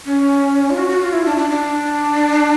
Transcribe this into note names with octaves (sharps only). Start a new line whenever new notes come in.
C#4
F4
F#4
F#4
F4
E4
D4
D4
D4